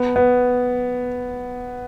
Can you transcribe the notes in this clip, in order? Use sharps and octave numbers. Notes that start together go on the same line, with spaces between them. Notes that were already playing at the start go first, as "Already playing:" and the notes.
Already playing: B3
B3